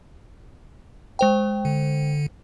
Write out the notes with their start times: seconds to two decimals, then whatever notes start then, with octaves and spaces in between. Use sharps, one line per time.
1.19 G#3 C5 G5
1.65 D3